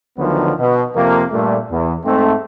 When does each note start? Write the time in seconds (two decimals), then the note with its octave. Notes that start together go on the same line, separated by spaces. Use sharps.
0.18 D2 D3 D#3 F3 F#3 B3
0.60 B2
0.96 F2 C3 F3 A#3
1.32 G2 A#2 A3
1.71 E2
2.05 G#2 A3 C4